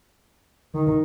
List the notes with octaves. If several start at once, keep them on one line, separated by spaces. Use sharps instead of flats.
D#3